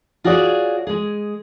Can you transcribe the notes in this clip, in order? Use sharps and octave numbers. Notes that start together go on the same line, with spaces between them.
F4 F#4 G#4 C#5 D5
G#3 G#4